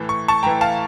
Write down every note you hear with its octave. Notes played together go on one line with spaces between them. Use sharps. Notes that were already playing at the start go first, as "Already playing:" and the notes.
Already playing: A2 E3
C#6
A5 C#6
A2 E3 G5 A#5
F5 A5